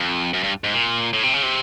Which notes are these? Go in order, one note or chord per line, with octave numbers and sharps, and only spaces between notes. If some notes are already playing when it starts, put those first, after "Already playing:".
Already playing: F2
F#2
G2
G#2
A#2
A2
C3
C#3
C3